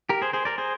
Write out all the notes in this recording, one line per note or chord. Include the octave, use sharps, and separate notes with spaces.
G4 A#4
G#4 C5
G#4 C5
A#4 D5
G#4 C5